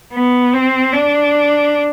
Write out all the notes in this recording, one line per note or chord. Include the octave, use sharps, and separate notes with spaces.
B3
C4
D4